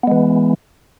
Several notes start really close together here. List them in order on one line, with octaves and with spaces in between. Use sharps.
B3 G#3 E3